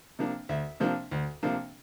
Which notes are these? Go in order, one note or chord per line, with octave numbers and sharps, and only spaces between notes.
C3 F3 A#3 D4
D2 E5
C3 F3 A#3 D4
D2
C3 F3 A#3 D4